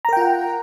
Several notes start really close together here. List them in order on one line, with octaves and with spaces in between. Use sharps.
A#5 A#4 G5 F4 F#5